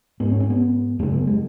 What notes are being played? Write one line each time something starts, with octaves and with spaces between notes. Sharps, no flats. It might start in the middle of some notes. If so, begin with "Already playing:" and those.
G#2 B3
C#4
C#4
B3
F#2 C#3 A3
B3
G#3